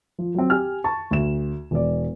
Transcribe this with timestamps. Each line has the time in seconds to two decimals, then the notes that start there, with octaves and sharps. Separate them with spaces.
0.19 F3
0.35 F#3 C4
0.50 G4 G#5 F6
0.84 A5 C#6
1.11 D2 E7
1.71 E1 D5